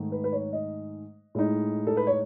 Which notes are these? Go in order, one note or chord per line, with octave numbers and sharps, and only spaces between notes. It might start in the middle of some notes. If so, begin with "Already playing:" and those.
Already playing: G#2 D#3 A3 D#4
B4
B4
C#5
D#5
A2 G#3 D#4
A4
B4
C#5